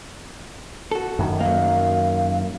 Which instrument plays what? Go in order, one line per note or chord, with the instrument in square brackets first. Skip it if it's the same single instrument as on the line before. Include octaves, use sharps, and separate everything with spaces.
[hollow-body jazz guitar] F#4 A4
[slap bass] F#2 D#3
[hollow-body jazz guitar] F#3 A#3 [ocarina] F5